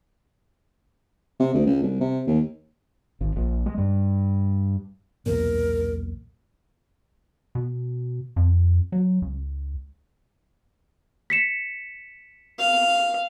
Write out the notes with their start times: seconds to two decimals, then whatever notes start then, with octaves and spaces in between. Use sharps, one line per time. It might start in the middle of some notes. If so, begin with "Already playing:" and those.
1.39 C3
1.54 D2
1.66 C#2
1.83 C2
2.01 C3
2.27 D#2
3.21 G#1
3.36 A#1
3.66 G#3
3.78 G2
5.26 B1 E2 A#2 A#4
7.55 B2
8.36 F2
8.92 F#3
9.22 C#2
11.30 B6 C#7 E7
12.59 F5